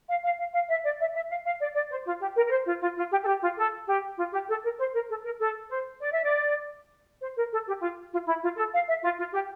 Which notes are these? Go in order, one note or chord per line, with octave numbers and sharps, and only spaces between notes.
F5
F5
F5
F5
E5
D5
E5
E5
F5
F5
D5
D5
C5
F4
G4
A#4
A#4
C5
F4
F4
F4
G4
A4
G4
F4
A4
G4
F4
G4
A4
A#4
C5
A#4
A4
A#4
A4
C5
D5
E5
D5
C5
A#4
A4
G4
F4
F4
E4
F4
A4
F5
E5
F4
F4
G4